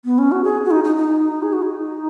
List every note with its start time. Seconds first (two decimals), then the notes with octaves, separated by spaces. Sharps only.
0.05 B3
0.18 C#4
0.32 F#4
0.44 G#4
0.65 F#4
0.71 D#4
0.84 D#4
0.96 D#4
1.43 G#4
1.53 F#4
1.62 D#4